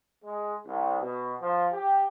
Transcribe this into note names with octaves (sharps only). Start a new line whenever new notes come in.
G#3
C2
B2
F3
G4